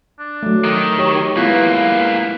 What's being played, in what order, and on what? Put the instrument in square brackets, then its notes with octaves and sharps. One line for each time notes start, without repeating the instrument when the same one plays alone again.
[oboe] D4
[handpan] F#3 A3
[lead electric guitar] D#3 [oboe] D#5
[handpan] G4 C#5
[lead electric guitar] G#2 A#3 [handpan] B3 E4 F4 [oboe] B4